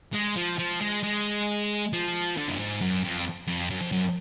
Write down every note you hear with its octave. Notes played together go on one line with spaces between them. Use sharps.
G#3
F3
F3
G#3
G#3
F3
D3
F#2
G#2
F#2
F2
F2
F#2
F2
F#2